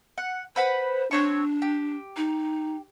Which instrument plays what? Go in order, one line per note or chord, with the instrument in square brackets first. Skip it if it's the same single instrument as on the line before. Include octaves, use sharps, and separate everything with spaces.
[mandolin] F#5
[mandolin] B4 F#5 B5 [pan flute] C5
[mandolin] C4 C#5 C#6 [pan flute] D4
[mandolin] G4
[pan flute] D#4